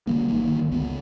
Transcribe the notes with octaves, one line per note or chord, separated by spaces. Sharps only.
D3 G3 A#3
G1 D3 D#3 A#3
C#2 B3